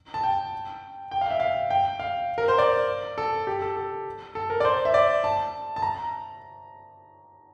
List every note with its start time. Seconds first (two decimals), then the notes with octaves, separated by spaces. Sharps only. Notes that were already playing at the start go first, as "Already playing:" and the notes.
0.14 A5
0.23 G5
1.11 G5
1.21 F5
1.31 E5
1.40 F5
1.70 G5
1.99 F5
2.38 A#4
2.48 C5
2.58 D5
3.18 A4
3.47 G4
3.62 A4
3.76 A4
4.35 A4
4.50 A#4
4.60 D5
4.64 C5
4.85 E5
4.94 D5
5.24 A5
5.76 A5
5.82 A#5